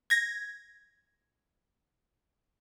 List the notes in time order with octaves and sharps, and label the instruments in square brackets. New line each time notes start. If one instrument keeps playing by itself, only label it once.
[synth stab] G#6 A#6